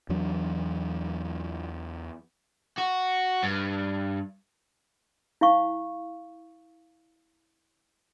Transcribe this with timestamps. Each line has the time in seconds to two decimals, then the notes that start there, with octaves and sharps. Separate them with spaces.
0.09 E2 E3 F#3 D4
2.78 F#4
3.43 G2
5.41 E4 F5 C#6